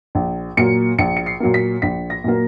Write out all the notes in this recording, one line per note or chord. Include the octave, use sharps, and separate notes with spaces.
A#1
A#2 F#3 A#3 C#7
A#1 C#7
C#7
C7
A#2 F#3 A#3
B6
A#1 B6
A#6
A#2 F#3 A#3